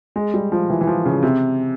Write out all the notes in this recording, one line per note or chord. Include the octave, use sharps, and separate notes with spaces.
G#3
G3
F3
E3
E3
F3
C#3
C3